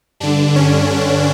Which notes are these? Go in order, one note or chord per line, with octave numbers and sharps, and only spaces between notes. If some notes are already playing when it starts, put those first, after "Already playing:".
G2 D3 D4
C#4
D4